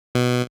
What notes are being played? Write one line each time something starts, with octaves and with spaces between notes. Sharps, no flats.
B2